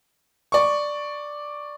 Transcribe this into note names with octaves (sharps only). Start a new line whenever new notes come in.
D5 C#6